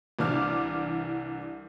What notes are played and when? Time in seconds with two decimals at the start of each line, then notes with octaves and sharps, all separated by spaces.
0.19 C2 E3 D4 D6 F6